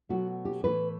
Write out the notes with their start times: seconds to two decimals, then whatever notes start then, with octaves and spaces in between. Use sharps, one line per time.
0.09 B2 F#3 A3 F#4
0.45 G4
0.64 A2 E3 A3 B4